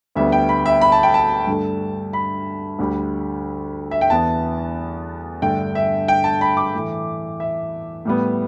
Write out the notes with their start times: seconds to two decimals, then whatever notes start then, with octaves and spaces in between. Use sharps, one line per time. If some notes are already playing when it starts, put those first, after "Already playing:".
0.15 D2 D3 G3 B3 E5
0.32 G5
0.49 B5
0.66 E5
0.81 B5
0.92 A5
1.03 G5
1.14 A5
1.47 G2 D3 A3
2.13 B5
2.79 D2 D3 G3
3.91 E5
4.01 G5
4.10 E2 E3 B3 A5
5.42 G2 D3 A3 G5
5.75 E5
6.08 G5
6.24 A5
6.41 B5
6.57 D6
6.74 A2 E3 A3
7.40 E5
8.05 A2 G3 B3